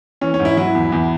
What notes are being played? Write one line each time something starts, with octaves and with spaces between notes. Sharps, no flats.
E3 C#4
C#4
G#2
E4
F#3 E4
E2
E2